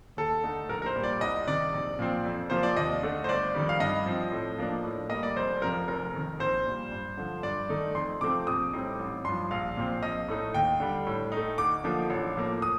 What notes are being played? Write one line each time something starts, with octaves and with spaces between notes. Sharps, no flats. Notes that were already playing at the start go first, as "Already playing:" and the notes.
D#2 A4
D3 A3 D#4
A#1 A#4
A#4
C5
A#2 G3
D5
C2 D#5
C3 D#3 D5
A#1
A#2 F3 C4
F2
C3 F3 A#3 C5
D5
D#2 D#5
D3 A3 D4
C5
G1 D5
F2 D#3 G3
F5
G2 D#5
F3 C4
A2
F3 A#3 D4
A2
G3 A#3 D#5
D5
F1 C5
F2 C3 F3 A#4
F1 A#4
F2 D#3
A#1 C5
A#2 G3
G2
D3 F3
G2 D5
D#3 A3 D#4
F2 C6
C3 F3 A3 C4 D6
A#1 D#6
A2 G3 C4 D#4
A1
G2 F3 C6
A#1 F5
A#2 F3 C4
A#1 D#5
A2 A3 D#4
D#2 G5
D3 G3
A2
A3 D#4
D2 D6
D3 F3 A#3 D#4
A1
A2 F3 A#3
D#6